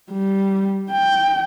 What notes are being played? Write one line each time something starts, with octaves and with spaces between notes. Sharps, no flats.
G3
G5